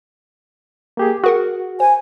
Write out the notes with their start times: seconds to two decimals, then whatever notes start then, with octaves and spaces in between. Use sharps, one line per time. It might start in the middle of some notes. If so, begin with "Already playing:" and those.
0.97 A#3 G4 G#4
1.24 F#4 G#4 A#4 F#5
1.80 C5 G#5